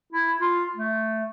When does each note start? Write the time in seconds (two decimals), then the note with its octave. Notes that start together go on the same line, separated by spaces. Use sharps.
0.13 E4
0.41 F4
0.75 A3